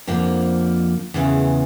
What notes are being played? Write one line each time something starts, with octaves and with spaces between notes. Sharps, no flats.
F2 D3 F3 A#3
E2 C#3 E3